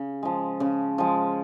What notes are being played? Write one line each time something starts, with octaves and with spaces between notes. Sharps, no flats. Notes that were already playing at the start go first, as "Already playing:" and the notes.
Already playing: C#3
F3 G#3
C#3
F3 G#3